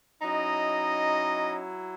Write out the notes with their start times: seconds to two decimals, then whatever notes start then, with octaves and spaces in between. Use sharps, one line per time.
0.21 F#3 C#4 D#4 E4 D#5